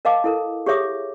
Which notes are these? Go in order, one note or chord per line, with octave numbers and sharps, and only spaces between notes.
A#4 D#5 F5 A5 D6
E4 A4 A#4
G4 G#4 C#5 E5 D6 D#6